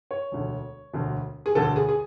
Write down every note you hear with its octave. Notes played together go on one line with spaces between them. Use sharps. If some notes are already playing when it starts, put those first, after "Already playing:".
C#5
E1 D2 D3
E1 D2 D3
G#4
E1 D2 D3 A4
G#4
G#4